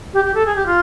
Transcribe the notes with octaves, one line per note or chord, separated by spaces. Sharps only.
G4
G4
A4
G#4
G4
F4